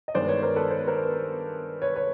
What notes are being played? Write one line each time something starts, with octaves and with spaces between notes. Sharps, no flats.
D#5
G2 D#3 G#3 B3 C5 D5
B4 C#5
A#4 C5
A4 B4
C5
B4
A#4 C5
B4 C#5
B4 C#5